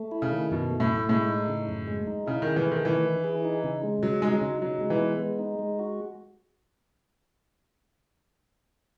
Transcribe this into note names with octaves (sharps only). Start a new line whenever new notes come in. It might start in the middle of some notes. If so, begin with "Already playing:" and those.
Already playing: A3
E4
C#3
D#3
F#2 B2
A3
A2
E4
A2 G#3
D#4
C#3
F#2
G#3
D#4
C#3 E4
D#3
G#4
E3
A3
D#3
D#3 E3
E4
G#4
D#4
C#3
G#3
C#3 F#3
G#3 D#4
F#3
C#3
F#3 D#4
G#3
E3
B3
G#3
D#4
G#3
F#4